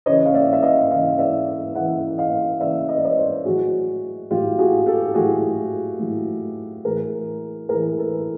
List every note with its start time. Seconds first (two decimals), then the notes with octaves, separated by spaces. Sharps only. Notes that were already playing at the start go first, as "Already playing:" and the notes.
0.06 C#3 E3 C#5 D#5
0.26 F5
0.34 D5 E5
0.53 E5
0.62 D#5 F5
0.91 C#3 E3 D#5 F5
1.19 D5 E5
1.75 C#3 E3 E5 F#5
2.18 D#5 F5
2.60 C#3 E3 D5 E5
2.88 D#5
2.98 D5
3.05 C#5 D#5
3.17 C5 D5
3.45 A2 F#3 F#4 G#4
4.30 A2 F#3 F4 G4
4.59 F#4 G#4
4.86 G4 A4
5.15 A2 F#3 F#4 G#4
5.99 A2 F#3
6.85 A2 E3 G#4 A#4
7.69 A2 E3 G#4 A#4
7.97 A4 B4